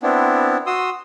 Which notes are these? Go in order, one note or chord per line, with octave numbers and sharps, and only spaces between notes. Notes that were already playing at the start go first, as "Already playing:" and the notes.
B3 C4 D4 E4
F#4 C6 D#6 E6